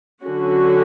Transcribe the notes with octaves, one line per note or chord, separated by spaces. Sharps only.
D3 F#3 C#4 F#4